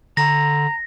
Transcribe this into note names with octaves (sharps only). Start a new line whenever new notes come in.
D3 A#5 A#6